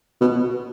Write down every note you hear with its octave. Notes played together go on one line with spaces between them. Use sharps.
B2